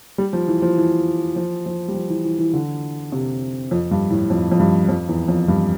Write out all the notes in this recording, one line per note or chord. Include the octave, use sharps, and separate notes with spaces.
G3
F3
E3
F3
E3
F3
F3
G3
F3
E3
E3
E3
D3
C3
F2
G2
A2
F2
F2
G2
F2
E2
F2
G2